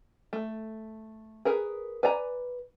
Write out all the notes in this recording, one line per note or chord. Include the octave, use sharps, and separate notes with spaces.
A3
G#4 A#4 B4
B4 D5 G#5 A#5